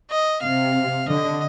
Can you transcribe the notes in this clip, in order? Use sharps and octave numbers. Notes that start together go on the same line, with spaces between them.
D#5
C3 F5
D3 D#5